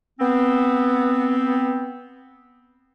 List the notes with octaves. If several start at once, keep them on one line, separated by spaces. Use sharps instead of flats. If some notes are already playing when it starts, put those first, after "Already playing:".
B3 C4